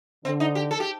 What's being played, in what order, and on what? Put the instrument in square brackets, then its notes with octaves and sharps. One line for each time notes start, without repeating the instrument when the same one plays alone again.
[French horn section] D3 [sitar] C4
[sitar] D#4
G4
A4
G4